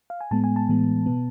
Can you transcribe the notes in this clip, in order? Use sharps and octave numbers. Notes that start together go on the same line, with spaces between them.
F5
G#5
A2 G#3 B3 A5
G#5
A5
A2 E3 G#3 B3
B2 B3